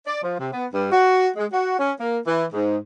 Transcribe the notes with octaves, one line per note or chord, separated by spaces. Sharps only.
D5
F3
C3
B3
G2
F#4
G#3
F#4
C#4
A#3
E3
G#2